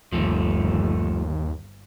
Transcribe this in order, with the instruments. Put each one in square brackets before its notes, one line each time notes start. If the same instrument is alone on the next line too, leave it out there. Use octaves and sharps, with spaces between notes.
[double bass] G1 [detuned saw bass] D#2 [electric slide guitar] F3 A3